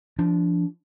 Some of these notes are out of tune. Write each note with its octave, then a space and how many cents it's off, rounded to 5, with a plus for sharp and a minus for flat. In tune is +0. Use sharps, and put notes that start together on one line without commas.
F3 -25 D4 -10